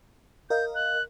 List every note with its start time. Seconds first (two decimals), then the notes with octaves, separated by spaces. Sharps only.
0.50 A#4 D#5 F5 G6
0.75 F#6